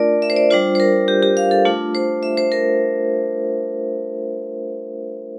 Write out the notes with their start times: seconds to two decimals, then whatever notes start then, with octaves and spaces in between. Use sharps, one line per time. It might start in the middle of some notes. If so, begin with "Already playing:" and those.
Already playing: A3 D4 F4 A#4 D5
0.22 E5
0.30 C5
0.37 D5
0.50 G3 D4 F4 C5
0.75 C5
0.80 A#4
1.08 G4
1.23 G4
1.37 F5
1.51 A4
1.65 A3 D4 F4
1.95 C5
2.23 E5
2.37 C5
2.52 A#4